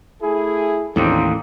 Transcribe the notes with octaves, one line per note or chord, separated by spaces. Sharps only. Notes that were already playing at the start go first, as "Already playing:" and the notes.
A3 E4 G#4
A1 D#2 A2 D3 C4